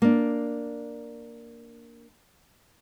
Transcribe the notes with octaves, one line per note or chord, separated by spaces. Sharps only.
A#3 D4